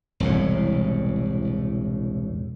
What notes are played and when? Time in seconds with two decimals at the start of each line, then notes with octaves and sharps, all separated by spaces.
0.20 E1 C2 A2